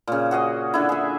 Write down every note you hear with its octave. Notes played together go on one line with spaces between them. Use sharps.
A#2 C#3
F#4 G#4 D#5 G#5
D3 E4
G#4 E5